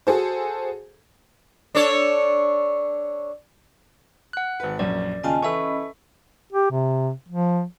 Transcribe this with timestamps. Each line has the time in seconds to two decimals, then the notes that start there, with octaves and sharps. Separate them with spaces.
0.07 F#4 G#4 A4 C5
1.75 D4 A4 C#5
4.33 F#5 F#6
4.60 G#1 B4
4.79 A#1 F#2 C#4 D5
5.23 D#2 C#3 F4 D#5 G#5 A5
5.43 E3 C#4 A4 D#5 E5 B5 C#6
6.53 G4
6.71 C3
7.29 F3